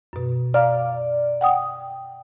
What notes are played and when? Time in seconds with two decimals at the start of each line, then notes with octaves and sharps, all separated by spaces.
0.13 F#2 B2
0.54 D5 F5 A#5 F6
1.41 F#5 G5 D#6